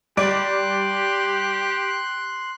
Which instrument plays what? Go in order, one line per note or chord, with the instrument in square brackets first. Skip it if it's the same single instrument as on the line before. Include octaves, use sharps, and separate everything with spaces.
[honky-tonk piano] G3 D5 D7 [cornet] G4 [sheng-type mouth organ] C6 F#6